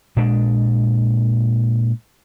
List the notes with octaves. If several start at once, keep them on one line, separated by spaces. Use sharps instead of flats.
A#2 G#3 D4